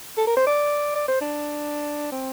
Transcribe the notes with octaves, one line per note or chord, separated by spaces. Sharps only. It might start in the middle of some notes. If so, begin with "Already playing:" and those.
A4
A#4
C5
D5
D5
C5
D4
C4